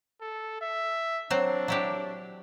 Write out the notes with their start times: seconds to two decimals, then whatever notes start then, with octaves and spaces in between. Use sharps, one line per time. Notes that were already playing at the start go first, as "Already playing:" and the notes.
0.21 A4
0.61 E5
1.30 F#3 C4 D4
1.68 F#3 E4 G4